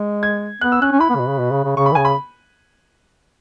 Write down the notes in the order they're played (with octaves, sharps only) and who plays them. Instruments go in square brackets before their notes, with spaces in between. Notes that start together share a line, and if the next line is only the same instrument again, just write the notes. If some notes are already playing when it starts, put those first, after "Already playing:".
Already playing: [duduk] G#3
[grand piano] G#6
[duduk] B3 [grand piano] F#6
[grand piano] E6
[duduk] C#4 [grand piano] F#6
[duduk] C#4
[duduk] E4 [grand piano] B5
[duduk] B3
C#3
B2
C#3
B2
C#3
C#3
[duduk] C#3 [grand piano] C#6
[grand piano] B5
[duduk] E3
[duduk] C#3 [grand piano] G#5
[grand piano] B5